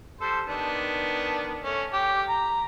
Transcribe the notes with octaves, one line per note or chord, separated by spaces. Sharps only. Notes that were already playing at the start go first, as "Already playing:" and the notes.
G3 A4 C5
D#3 B3 D4
A3 C#4
G4
A#5